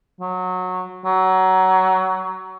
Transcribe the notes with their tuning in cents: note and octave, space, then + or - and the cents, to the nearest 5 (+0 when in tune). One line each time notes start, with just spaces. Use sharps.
F#3 -15
F#3 +20